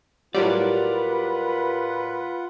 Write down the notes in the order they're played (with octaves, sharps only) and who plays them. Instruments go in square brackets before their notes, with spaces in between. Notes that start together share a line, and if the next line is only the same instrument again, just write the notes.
[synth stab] A2 F#3 G3 [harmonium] F4 F#5 [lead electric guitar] A#4 D5 [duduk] B4